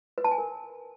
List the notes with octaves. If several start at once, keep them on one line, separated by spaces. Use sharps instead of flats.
B4
A5
G#5
A#4